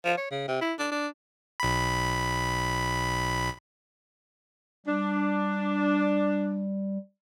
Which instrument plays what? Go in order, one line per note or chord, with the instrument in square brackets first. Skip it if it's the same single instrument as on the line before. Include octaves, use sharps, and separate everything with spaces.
[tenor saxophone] F3
C#5
C#3
C3
E4
D4
D4
[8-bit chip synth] B1 B5
[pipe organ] G3 [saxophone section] D4